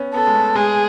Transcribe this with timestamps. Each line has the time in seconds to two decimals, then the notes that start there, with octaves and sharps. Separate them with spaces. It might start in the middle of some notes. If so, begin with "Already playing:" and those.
Already playing: B3 C#4
0.14 B3 A4
0.27 G#3
0.35 A3
0.55 G#3 G#4